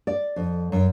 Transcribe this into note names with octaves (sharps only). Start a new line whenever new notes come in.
D5
F2
F#2